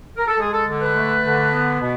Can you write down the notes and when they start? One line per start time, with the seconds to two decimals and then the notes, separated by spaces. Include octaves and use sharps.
0.17 A#4
0.28 A4
0.39 G#3 G#4
0.53 A4
0.67 D3
0.81 B4
0.95 A3
1.23 D3
1.51 B3
1.79 B2